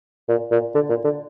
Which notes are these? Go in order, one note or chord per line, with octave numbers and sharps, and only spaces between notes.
A#2
A#2
D3
A#2
D3